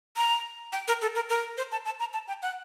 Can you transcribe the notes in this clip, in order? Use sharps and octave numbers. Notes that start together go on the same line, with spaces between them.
A#5
G5
A#4
A4
A#4
A#4
C5
A5
A5
A#5
A5
G5
F#5